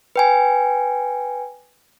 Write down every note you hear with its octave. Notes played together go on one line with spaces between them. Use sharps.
B4 G5 G#5